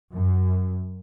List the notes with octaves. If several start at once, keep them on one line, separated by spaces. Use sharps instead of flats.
F#2